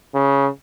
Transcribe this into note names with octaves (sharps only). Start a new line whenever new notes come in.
C#3